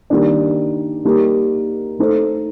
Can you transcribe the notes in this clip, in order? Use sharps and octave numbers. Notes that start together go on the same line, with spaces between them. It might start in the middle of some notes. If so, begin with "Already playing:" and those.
D#3 G3 A#3 D4
G3 A#3 D#4 G4 A#4
A3 D#4 A4 C5